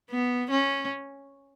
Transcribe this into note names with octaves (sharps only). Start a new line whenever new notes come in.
B3
C#4